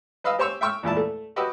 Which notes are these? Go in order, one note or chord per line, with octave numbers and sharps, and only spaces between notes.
B4 D#5 F5 E6
G4 C5 C#5 C#6 E6
E5 G5 C#6 E6 F6
E2 A#2 E4 A5
A3
F#4 G4 B4 D#5 G5 E6